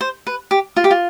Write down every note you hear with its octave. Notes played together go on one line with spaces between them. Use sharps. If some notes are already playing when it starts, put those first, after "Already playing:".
C5
B4
G4
F4
G4
F4